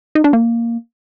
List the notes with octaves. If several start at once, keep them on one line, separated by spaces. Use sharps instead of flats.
D#4
D4
A#3